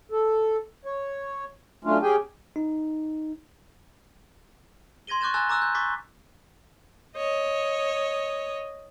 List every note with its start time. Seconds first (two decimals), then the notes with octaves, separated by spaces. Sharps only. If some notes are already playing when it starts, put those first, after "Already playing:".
0.11 A4
0.85 C#5
1.84 F#3 A3 C#4 D4 F4
2.02 C#4 G4 G#4 G5 G#5
2.56 D#4
5.07 C6 G#6 A#6 D#7 G7
5.21 C#6 D6 F#6 G6 A6 E7
5.34 G#5 A#5 C#6 E6 F#6 A6
5.49 A#5 D6 E6 F#6
5.62 G6
5.75 C#6 D6 A6 B6
7.16 C#5 D#5